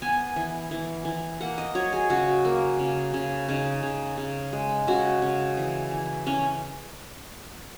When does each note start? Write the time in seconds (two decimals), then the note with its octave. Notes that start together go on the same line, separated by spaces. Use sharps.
0.02 B3 G#5
0.36 E3
0.71 E3
1.05 E3
1.41 A#3 F#5
1.58 D#5
1.75 F#3 C#5
1.93 G#4
2.10 C#3 F#4
2.45 A#3
2.79 C#3
3.14 C#3
3.48 C#3 D#4
3.83 C#3
4.17 C#3
4.53 G#3
4.87 C#3 F#4
5.22 C#3
5.57 E3
5.91 E3
6.26 E3 C#4